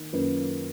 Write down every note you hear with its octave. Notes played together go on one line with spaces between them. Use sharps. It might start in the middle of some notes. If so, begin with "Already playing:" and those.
Already playing: D#3 A#3
F#2 D#3 A#3 F4 B4